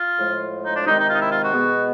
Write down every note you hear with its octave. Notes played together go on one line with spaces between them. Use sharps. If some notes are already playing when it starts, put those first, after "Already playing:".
Already playing: F4
A2 F3 G#3
D#4
D4
C3 D#3 G#3 D#4
D#4
F4
D#4
E4
F4
F#4
B2 G#3 B3